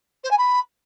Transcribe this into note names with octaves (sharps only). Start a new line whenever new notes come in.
C5
G#5
B5